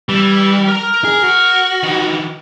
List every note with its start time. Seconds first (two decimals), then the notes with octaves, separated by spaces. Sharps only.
0.09 E3 G3
0.68 A#4 A#5
1.05 G#4
1.24 F#4
1.83 D#3 E3